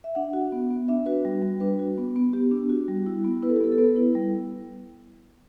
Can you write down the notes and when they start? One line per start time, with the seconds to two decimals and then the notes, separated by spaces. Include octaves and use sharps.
0.04 E5
0.15 D4 F#5
0.33 F#4
0.52 B3
0.70 B3
0.88 D4 E5
1.06 F#4 B4
1.25 G3
1.42 G3
1.60 D4 B4
1.79 F#4
1.98 B3
2.16 B3
2.33 B3 G4
2.51 D4
2.69 F#4
2.88 G3
3.06 E4
3.25 B3
3.42 E4 B4
3.49 A4
3.56 G4
3.60 B3 A4
3.72 A4
3.78 B3 B4
3.96 E4
4.15 G3